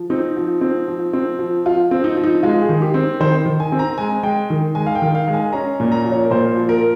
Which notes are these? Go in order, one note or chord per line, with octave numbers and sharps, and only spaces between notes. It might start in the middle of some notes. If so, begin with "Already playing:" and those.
Already playing: F3
C4 D#4
F3
C4
F3
C4
F3
F3 F4
C4
D#4
F3
D#4
G#3 F4
G#4
D#3
G4
C4
D#3 C5
D#3
G#5
C4
A#5
G#3 G#5
G#3 G5
D#3
G#3 G#5
F5
G5
D#3
F5
G#3
G#5
C#4 A#5
A#2
A#5
F3
C#5
A#4
A#2 C5
F3
A#4